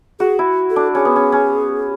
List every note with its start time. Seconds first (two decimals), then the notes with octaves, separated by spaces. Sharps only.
0.19 F#4 G#4
0.39 E4
0.70 A4
0.76 D4
0.95 C#4 G#4
1.05 B3
1.16 C#4
1.32 C#4